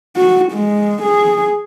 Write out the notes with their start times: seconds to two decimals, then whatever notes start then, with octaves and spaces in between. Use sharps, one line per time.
0.16 F#4
0.52 G#3
1.03 G#4